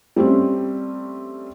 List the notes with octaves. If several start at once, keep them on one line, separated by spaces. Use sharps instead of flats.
G3 A3 C4 C#4